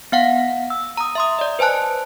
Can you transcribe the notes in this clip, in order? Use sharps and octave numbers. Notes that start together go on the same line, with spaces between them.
B3 F5 F#5
E6
A#5 D#6
E5 C6 D#6
D5 D#5
B4 C5 G#5 A5 F#6